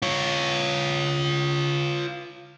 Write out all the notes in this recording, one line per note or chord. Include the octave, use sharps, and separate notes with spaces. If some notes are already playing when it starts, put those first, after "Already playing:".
F4 C#5